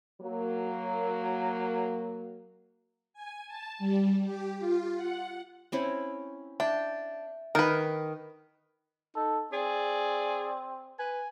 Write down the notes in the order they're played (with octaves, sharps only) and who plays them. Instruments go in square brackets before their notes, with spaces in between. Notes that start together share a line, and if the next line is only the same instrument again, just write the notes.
[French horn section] F#3 A#3
[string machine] G#5
A5
G3
G4
F4
F#5
[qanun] C4 C#4 E4
[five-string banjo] D4 [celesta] E5 [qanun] G5
[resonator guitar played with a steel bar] D#3 [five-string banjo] A#4 B4
[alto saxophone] D#4 [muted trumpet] A4
[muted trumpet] C4 [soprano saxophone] G#4 [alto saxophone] D5
[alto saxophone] B4 [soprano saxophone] G#5